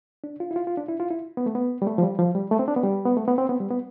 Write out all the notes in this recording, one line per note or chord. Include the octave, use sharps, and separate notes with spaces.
D4
F4
E4
F4
F4
D4
E4
F4
E4
B3
A3
B3
G3
A3
F3
G3
F3
G3
A3
C4
D4
B3
G3
B3
A3
B3
C4
B3
G3
B3